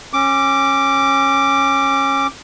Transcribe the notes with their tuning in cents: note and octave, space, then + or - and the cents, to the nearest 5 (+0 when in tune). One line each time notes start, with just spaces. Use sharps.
C#4 -25 D6 +0